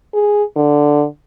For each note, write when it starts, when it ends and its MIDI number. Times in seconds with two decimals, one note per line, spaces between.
0.14 0.43 68
0.56 1.04 50